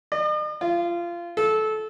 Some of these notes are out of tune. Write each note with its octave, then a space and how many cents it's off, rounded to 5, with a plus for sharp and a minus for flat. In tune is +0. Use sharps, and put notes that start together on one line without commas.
D#5 -45
F4 -20
A4 -20